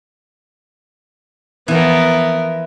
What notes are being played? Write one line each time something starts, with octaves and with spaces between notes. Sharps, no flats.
E3 F3 B3 A#4